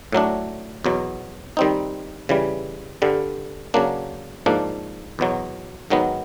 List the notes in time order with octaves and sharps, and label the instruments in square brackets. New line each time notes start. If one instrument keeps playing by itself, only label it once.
[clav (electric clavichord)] A2 F#3 A3 D4
E2 B2 F#3
D#3 G3 C4 D#4
C#3 E3 G3
G2 D3 G3
C#3 F#3 A#3 D4
G#2 F3 A#3 D4
E2 B2 F#3
G#2 D#3 F#3 B3